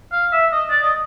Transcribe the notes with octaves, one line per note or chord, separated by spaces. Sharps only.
F5
E5
D#5
D5
D#5